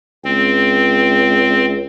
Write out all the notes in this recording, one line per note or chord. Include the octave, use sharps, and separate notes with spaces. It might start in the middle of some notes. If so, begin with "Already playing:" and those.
C#2 C4